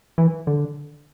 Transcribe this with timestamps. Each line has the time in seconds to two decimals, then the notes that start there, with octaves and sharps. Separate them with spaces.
0.18 E3
0.47 D3